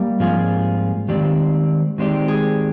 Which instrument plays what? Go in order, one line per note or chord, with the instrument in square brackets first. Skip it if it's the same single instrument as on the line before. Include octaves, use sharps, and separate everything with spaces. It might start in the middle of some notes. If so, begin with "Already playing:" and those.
Already playing: [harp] G3 A#3
[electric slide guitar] G#2 F3 C4 F4 G#4
D#3 G#3 C4 G4 D5
D#3 G#3 C4 G4 D5
[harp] G#4